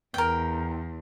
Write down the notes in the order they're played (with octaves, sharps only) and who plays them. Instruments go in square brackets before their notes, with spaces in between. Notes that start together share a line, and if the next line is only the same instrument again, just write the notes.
[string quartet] E2 [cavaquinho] A#4 G5